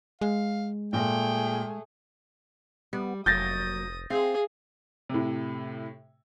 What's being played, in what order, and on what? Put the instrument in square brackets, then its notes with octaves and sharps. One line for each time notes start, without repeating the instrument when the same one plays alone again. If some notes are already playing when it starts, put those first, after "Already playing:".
[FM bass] G#3 [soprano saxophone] F5
[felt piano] A#2 [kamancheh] A3 G#4 [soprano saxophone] G5
[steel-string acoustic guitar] G3 [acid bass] B3
[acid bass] F1 [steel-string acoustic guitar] F#3 A#3 [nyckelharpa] D#6 [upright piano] G6 A6 A#6
[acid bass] C4 [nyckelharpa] G#4 [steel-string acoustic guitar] F5
[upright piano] A2 C3